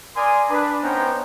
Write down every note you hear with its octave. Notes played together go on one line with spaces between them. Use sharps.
A#4 D5 G#5 C6 D#6
D4 B4
B3 C#4 D#4 C5 G5 A#5